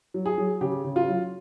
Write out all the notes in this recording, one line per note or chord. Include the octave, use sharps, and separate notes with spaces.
F#3
G#4
F#3
C#3 G4
C#3
F4
F#3